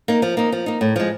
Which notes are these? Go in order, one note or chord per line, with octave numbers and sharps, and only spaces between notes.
A#3 D#4
F3
A#3 D#4
F3
A#3 D#4
A2
F3 G#3